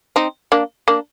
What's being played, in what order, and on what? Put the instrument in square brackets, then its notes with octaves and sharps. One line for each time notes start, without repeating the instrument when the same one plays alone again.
[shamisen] C4 D#4
A#3 D4
A#3 D4